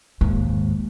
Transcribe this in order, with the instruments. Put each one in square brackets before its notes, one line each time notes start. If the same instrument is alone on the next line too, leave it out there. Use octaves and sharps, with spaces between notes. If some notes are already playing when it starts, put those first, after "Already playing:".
[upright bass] D#2 G#2